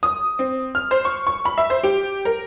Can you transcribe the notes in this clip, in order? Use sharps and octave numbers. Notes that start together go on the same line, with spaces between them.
D#6
C4
F6
C5
C#6
C#6
B5
E5
C5
G4
A#4